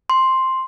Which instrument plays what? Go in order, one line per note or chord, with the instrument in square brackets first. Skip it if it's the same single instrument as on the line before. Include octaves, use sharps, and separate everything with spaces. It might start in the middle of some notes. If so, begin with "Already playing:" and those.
[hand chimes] C6